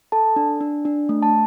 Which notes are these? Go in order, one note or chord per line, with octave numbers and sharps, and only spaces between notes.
A4 A5
D4
D4
D4
A3
A5